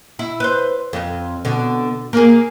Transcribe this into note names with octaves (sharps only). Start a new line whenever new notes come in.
E4
B4 C5
F2
B2 D3
A#3 G#4